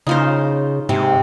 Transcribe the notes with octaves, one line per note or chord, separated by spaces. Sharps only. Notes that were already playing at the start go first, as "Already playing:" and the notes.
C#3 D#4 F4 C5
G#2 C3